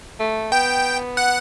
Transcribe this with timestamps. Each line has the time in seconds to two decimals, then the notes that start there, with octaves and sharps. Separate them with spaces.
0.20 A3
0.52 B3 G5
1.17 F#5